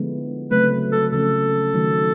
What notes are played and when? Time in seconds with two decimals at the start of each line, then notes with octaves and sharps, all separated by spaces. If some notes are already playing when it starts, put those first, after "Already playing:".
Already playing: D3 F3 G#3 B3 E4
0.51 C#3 F#3 A3 C4 B4
0.92 A4
1.12 C#3 F3 A3 C#4 A4
1.74 D#3 F#3 A3